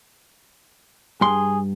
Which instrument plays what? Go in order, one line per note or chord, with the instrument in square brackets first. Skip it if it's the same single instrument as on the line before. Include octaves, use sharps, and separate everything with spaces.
[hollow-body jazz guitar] G2 C6 [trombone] G#4